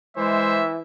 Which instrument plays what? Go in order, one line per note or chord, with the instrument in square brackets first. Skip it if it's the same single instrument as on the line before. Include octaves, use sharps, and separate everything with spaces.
[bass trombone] E3 [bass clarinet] G#3 [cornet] C5 [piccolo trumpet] E5